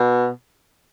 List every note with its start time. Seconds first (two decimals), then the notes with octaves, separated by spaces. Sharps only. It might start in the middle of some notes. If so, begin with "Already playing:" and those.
Already playing: B2